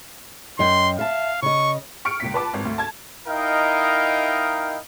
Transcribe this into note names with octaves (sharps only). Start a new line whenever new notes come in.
F#2 D#5 G5 C6
E5 F5 A5
C#3 D#5 C#6
C#6 F6 C#7 D7
C#2 A#2 B6
B4 A5 D6
G#1
D2
A5 G#6
D#4 E4 A#4 D#5 F5 G5